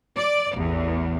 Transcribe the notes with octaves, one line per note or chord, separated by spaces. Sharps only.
D5
A1 E2